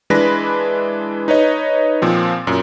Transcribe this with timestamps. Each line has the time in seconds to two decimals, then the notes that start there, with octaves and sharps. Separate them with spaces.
0.10 E3 G#3 D4 B4 B5 A#6
1.28 D#4 B4 C#5 D#5
2.02 A#2 F3 C4
2.47 F#2 A#2